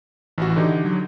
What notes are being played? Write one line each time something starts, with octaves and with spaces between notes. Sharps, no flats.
A1 E3 F#4
D3 D#4 G4
F#3